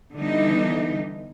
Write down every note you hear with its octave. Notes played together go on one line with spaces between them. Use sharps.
D3 E3 G3 B3 D#4